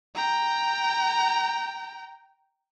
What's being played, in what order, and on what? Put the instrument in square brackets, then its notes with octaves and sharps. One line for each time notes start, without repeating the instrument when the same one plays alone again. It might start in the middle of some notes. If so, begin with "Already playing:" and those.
[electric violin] G5 A#5